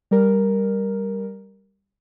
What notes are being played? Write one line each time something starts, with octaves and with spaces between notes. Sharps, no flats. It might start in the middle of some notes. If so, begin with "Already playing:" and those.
G3 A#4